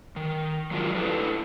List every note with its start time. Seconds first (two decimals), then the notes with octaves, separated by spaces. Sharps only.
0.16 D#3
0.71 F3 F#3 G#3 D4 F4 A#4
0.95 A2 D4 E4 A4 B4